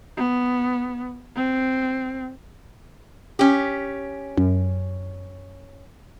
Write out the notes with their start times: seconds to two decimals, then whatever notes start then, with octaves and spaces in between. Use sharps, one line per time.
0.17 B3
1.36 C4
3.39 C#4 G4
4.38 F#2